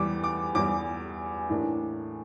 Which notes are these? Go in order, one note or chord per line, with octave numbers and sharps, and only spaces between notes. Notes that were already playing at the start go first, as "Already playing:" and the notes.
Already playing: E2 E3 G3 D6
D6
E2 E3 G3 D6
A2 E3 A#3 D4